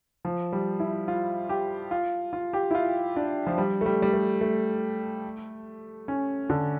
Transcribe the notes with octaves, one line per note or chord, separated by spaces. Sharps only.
F3
G3
E4
F4
G4
F4
F4
G4
E4
F4
D4
F3
G3
A3
G3
G3
A3
A3
C#4
D3